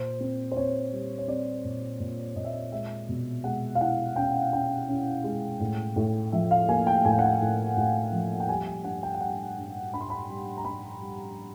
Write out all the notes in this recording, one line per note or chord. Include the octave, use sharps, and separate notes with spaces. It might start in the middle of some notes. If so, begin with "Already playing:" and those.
Already playing: A#2 C5
C4
C5
C4 C#5
G3
C#5
C4 D5
A#2
A#2
A#2 D#5
E5
D#5
G#3 E5
B2
G#3 F#5
F5
E4 F#5
C#4 G5
C#4 G5
C#4
G#3
A2
A2
F3 E5
F5
A#3 G#5
G5
A2 G#5
G5
F#5
G5
A2
A2
F3
G5
G3 G#5
G#5
G2 F#5
G5
G5
G3 F#5
G2
G2 B5
C6
B5
G3
A#5
G2 B5
G3